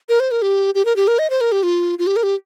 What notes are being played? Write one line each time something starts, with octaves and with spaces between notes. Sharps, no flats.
A#4
C5
A#4
G4
G4
A#4
G4
A#4
D#5
C5
A#4
G4
F4
F4
G4
A#4
G4